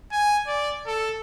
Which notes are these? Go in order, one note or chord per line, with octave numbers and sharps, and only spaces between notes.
G#5
D5
A4